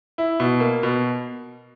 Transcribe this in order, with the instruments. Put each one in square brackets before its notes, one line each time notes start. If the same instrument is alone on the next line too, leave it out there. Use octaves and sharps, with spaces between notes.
[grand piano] E4
B2
A#3
B2